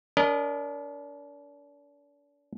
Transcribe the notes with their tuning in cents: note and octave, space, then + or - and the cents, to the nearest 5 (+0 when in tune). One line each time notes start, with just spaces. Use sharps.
D4 -40 A#4 +0 D#5 -20